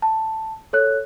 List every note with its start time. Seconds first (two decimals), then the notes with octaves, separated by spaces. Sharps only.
0.02 A5
0.73 A4 C#5 F#6